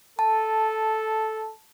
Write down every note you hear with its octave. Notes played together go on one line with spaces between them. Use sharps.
A4 A5